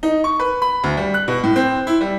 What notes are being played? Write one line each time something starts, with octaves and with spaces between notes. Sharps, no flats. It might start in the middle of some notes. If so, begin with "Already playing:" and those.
D#4
C#6
B4
B5
D2
G3
F#6
B2
A2
C4
E4
G3